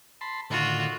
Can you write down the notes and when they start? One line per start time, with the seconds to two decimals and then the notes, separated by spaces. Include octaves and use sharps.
0.21 A5 B5 C6
0.50 A2 D3 D#3 F4 F#4